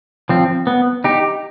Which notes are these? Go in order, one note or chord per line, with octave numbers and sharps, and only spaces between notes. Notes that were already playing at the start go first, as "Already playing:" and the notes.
F3 C4
B3
D#4 G4